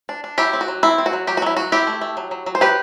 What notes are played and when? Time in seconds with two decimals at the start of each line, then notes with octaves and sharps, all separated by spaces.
0.09 D4
0.24 D4
0.38 F#3 E4 G4
0.53 C4
0.61 F#4
0.68 F#3
0.83 C4 E4
0.98 C4
1.06 F#4
1.13 F#3
1.27 F#3 G4
1.37 F#4
1.42 F#3 E4
1.57 F#3 F#4
1.72 C4 E4 G4
1.87 A3
2.01 A3
2.17 F#3
2.31 F#3
2.46 F#3
2.55 C5
2.61 F#3 G4 B4